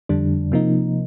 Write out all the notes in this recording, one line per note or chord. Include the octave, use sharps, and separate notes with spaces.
F2 D3 G3 D4
C3 F3 A#3 D#4